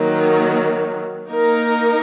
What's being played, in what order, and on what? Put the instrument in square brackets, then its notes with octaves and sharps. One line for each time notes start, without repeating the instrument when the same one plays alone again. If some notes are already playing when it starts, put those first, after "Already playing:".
Already playing: [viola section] D#3 F#3 A#3
A#3 D#4 A#4